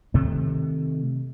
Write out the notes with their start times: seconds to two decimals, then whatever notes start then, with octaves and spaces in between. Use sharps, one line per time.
0.14 C3 D#3 A3